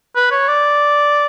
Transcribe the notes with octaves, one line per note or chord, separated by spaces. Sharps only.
B4
C#5
D5